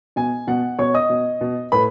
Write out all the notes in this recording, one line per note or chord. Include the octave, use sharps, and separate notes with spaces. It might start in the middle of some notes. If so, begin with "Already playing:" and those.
B2 G#5
B2 F#5
B2 C#5 C#6
D#5 D#6
B2
B2
A2 B4 B5